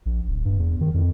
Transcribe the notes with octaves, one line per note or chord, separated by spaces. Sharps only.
A#1
D1
G2
E2
D#3
F2